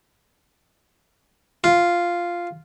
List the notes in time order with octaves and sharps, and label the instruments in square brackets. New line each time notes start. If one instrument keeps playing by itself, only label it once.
[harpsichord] F4